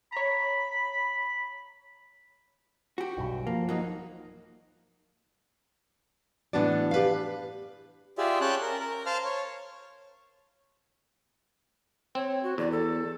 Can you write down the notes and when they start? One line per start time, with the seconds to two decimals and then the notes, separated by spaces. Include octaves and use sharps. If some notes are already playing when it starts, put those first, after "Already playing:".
0.12 C#5 A#5 B5
2.98 F#4 G4
3.17 B1 G2
3.47 F3 A#3
3.69 F#3 A#3 D#4
6.53 A2 E3 B3 D4 F#4 D5
6.91 G4 B4 F5
8.18 F4 G4 G#4 D5 E5
8.41 C#4 C#5 G5 A5 F#6
8.62 A#4
8.80 A#4
9.06 C5 F5 A5 F6
9.25 C#5
12.15 C4 C#5
12.43 F#4
12.58 E2 D5
12.71 A4